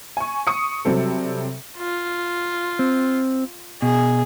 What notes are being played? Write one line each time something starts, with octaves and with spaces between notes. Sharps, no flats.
G#5 C#6
C#6 D#6 C#7
C3 F#3 G3 C4 A4
F4
C4
B2 G#4